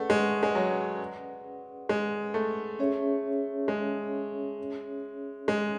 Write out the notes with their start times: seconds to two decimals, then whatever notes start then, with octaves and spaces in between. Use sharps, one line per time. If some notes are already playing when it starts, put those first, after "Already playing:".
Already playing: A3 C#4 G#4 B4 D5 F#5
0.10 G#3
0.43 G#3
0.55 F#3
1.89 G#3
2.34 A3
2.79 C#4 G#4 C#5 E5
3.68 G#3
5.48 G#3